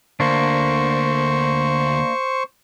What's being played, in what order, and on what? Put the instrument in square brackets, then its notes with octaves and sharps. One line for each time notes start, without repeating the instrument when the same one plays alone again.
[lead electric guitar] D2 [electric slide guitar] A#3 D4 [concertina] C5 C#6